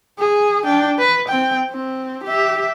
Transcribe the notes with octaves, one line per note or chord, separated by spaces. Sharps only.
G#4
D4 G5
B4
C4 G5
C4
G4 E5